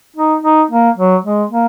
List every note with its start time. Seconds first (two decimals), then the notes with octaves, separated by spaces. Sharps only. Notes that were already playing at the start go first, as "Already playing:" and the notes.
0.17 D#4
0.44 D#4
0.71 A#3
0.98 F#3
1.25 G#3
1.51 A#3